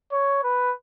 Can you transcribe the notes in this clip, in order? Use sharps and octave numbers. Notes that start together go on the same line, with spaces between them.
C#5
B4